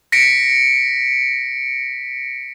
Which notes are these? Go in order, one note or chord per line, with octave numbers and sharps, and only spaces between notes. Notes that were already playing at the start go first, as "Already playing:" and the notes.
A#6 B6 C#7 D7